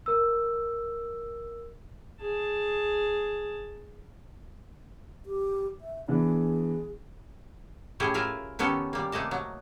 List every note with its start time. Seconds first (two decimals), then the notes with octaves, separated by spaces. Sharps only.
0.06 A#4 E6
2.21 G#4 A5
5.26 G4
5.81 E5
6.08 E3 B3 D4 G#4
8.00 A2 C#4 E4 G4 G#4
8.14 E4 F4 A#4 E5 G#5
8.59 D#3 B3 C#4 G4 A4
8.93 G3 A#3
9.12 C3 A3 A#3 D#5 A5
9.31 F#3